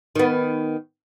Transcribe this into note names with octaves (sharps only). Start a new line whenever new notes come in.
D#3 B3